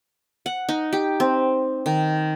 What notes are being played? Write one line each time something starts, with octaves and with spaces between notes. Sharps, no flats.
F#5
D#4
G4
C4
D#3